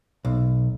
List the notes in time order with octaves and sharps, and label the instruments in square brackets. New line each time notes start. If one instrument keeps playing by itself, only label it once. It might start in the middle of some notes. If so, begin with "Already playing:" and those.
[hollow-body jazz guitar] B1